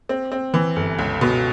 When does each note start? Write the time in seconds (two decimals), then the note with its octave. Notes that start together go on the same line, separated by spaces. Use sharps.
0.09 C4
0.32 C4
0.54 E3
0.76 G1
0.99 C#2
1.21 B2